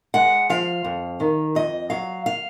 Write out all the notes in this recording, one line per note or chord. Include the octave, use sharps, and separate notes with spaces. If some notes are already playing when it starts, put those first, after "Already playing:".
G#3 F#5
F3 F5
F2
D#3
F2 D#5
F#3 F5
F5